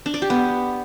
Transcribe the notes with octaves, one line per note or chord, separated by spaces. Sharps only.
D4
D5
G4
B3